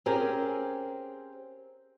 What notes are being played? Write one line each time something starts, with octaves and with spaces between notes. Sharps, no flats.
C4 C#4 G4 G#4 A#4